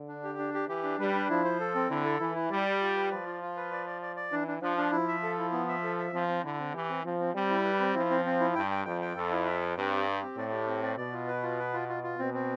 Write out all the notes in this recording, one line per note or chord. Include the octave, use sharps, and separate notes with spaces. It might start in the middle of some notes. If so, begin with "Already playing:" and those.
Already playing: D3
D4
G4
D4
G4
E3 G4
D4
G3 B4
D4
F3 E4
C5
A4
C4
D3 E4
A4
E3 E4
E4
G3 D5
D5
F4
B4
F3 D5
F4
F4
B4
D5
D5
D5
D5
E3 D4
D4
F3 D4
D4
F3 E4
E5
A4
E4
B3
E5
A4
E5
F3 C4
C4
D3 E4
C4
E3 G4
C4
F3 C4
C4
G3 C4
E4
B4
C4
F3 E4
C4
C4
E4
G2 G5
G5
F2 G5
G5
F2 A4
E4
E5
G5
G2 C4
G4
G4
C4
A2 D5
G4
C4
D5
B2 D5
F4
B4
F4
B4
F4
F4
F4
B2 C4
C4